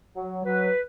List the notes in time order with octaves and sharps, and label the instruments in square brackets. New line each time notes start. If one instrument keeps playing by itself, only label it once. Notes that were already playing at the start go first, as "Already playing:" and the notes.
[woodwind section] F#3
F#3 B4